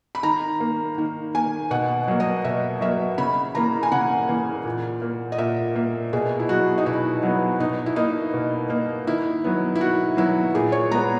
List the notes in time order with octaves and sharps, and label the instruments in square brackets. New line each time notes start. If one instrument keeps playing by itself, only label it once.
[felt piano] B5
D#3 A#5
A#3
D#3
A#3 G#5
B2 F#5
F#3 A#3
D#5
B2 E5
F#3 A#3 E5
C#3 B5
E3 A#3 A#5
G#5
C#3 F#5
E3 A#3
A#2
A#3
D#5
A#2 E5
A#3
B2 G#4
E4
F#3 B3 F#4
D#4
B2 E4
F#3 B3
B2 D#4
E4
A#3 D#4
B2
A#3
D#3 E4
F#3 B3
E4
D#3 F#4
F#3 B3 E4
A#2 G#4
C#5
G#3 B3 A#5